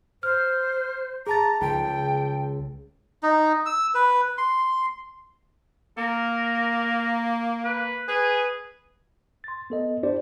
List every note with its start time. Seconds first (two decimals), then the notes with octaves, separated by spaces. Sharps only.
0.23 C5 F6
1.27 G#4 A5 A#5 A6
1.61 C#2 G5
3.23 D#4
3.66 E6
3.94 B4
4.38 C6
5.98 A#3 A#4
7.64 B4
8.08 G#4 B4
9.44 C6 A6
9.70 B3 A4 D#5
10.03 D4 E4 G4 C5 D5